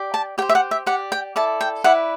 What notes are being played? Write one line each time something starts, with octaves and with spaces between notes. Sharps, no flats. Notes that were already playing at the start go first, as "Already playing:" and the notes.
Already playing: G4 D5
A5
G4 C5 G5
E5
F#5
E5
G4 D5 F#5
G5
E4 A4 D5 A5
G5
E4 B4 D5 F#5